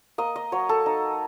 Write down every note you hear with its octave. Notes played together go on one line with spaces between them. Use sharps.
A#3 D#5
D#5
F#3 C#5
A4
D#4